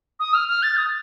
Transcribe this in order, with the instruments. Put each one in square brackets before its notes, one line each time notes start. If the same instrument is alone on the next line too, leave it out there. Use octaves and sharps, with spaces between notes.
[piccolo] D#6
F6
F6
A6
D#6